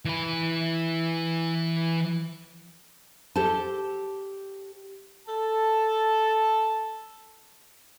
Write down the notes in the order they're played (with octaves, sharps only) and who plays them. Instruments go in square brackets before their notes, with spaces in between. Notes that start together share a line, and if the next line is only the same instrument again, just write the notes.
[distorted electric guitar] E3 B5
[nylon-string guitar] G4 A4 C5 A5
[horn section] A4 A5